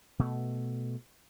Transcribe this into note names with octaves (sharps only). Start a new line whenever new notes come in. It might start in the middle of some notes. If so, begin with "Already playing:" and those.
B2 A3